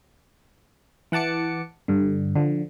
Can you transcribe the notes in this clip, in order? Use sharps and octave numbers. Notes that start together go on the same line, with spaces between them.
E3 F#5 A5 D6 C#7
G2 D3
D3 F3